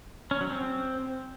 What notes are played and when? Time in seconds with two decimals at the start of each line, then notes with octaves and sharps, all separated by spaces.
0.31 C#4
0.41 F#3
0.50 C4